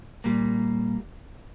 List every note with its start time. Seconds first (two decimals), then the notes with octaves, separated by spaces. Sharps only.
0.24 A#2 G3 A#3